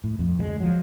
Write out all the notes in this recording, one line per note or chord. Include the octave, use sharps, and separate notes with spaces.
A2
F2
D2 E3 G#3
F3 F#3